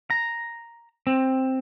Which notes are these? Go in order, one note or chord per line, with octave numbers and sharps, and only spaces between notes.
A#5
C4